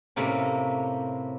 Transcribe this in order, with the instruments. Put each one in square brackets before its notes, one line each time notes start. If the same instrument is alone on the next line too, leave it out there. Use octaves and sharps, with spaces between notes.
[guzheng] A2 C3 A#3 C#4